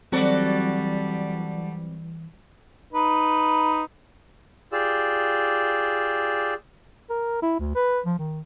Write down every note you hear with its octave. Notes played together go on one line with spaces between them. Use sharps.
E3 F#3 G3 C4 F#4 A4 D5
D#4 B4
F4 G4 G#4 D5 E6
A#4
E4
D2
B4
F3
D#3